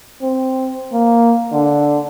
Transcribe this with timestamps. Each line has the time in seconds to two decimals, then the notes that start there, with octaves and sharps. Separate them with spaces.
0.22 C4
0.93 A#3
1.52 D3